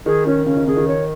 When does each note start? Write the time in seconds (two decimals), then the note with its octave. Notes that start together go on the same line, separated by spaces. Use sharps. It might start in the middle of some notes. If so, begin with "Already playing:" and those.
0.06 D#3 G#4
0.26 D#3 C#4
0.46 C#3 C#4
0.57 D#3
0.67 C#3 G#4
0.77 D#3
0.88 C#5